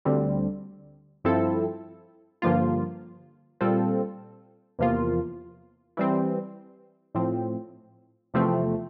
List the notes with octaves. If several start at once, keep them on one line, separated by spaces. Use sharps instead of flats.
D2 D3 G3 C4
G2 F3 C4 E4 A4
G2 D3 F3 A#3 F4
A#2 G3 C4 F4 A4
E2 C3 F3 A#3 F4
E3 G3 C4
A2 F3 C4
E2 C3 F3 A3 C4